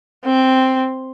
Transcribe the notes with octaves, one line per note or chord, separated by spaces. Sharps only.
C4